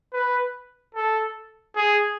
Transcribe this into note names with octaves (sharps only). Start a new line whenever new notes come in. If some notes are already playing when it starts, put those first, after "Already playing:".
B4
A4
G#4